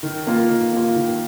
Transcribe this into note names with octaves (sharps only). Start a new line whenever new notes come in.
D#3
A#3 F4
D#3
A#3 F4
D#3